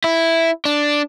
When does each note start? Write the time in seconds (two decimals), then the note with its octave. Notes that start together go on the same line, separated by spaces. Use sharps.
0.04 E4
0.65 D4